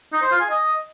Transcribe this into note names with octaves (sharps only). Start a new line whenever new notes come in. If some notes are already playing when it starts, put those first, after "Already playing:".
D#4
C5
F4
G#5
D#5